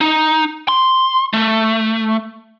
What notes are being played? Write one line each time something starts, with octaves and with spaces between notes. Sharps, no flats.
D#4
C6
A3